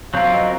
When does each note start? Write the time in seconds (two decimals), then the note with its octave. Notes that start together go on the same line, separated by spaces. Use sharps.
0.13 F#3 C4 F4 A#4 F5
0.33 D#5